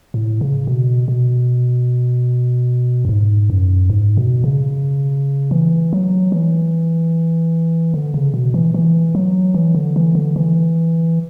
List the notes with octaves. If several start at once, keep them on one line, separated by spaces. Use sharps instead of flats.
A2
C#3
B2
B2
F#2
G#2
F#2
G#2
B2
C#3
E3
F#3
E3
D3
C#3
B2
E3
E3
F#3
E3
D3
E3
D3
E3